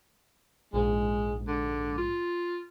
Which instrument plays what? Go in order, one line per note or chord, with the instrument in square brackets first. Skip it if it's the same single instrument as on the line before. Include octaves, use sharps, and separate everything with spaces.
[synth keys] A#1 G#2 [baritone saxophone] G#3
[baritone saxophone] D3
F4